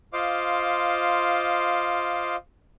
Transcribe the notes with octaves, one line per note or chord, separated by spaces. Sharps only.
F4 C5 D#5 F5 D6